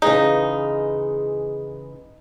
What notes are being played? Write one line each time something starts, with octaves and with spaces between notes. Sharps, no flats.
C#3 E3 G#3 D#4